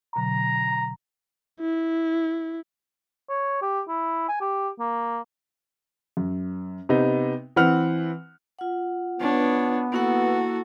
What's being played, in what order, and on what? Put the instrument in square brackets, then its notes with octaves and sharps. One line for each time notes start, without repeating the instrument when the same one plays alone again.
[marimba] B2 D3 F#3 [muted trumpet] A#5
[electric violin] E4
[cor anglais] C#5
G4
E4
G#5
G4
A#3
[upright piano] F#2
C3 B3 D#4
E3 C4 B4 F#5 F6
[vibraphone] F4 F#5
[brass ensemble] B3 [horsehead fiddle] D4 C#5
[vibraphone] A#3 E4 F#5 [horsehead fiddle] F#4 A4